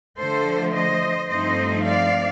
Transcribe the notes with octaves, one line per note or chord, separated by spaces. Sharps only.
D3 F3 A3 A4 C5
C5 D#5
G2 F3 A3 C4 D#4 C5 D#5
D5 F5